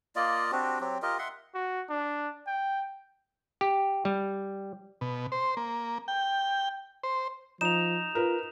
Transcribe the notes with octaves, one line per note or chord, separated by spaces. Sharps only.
A#3 F4 D5 D#5
C4 D4 F#4 G4
F#3 C4 G4
F4 G4 A#4 D#5
E5 F#5 C6
F#4
D4
G5
G4
G3
B2
C5
A#3
G5
C5
F3 D#4 E7 F7
F4 A#4 B4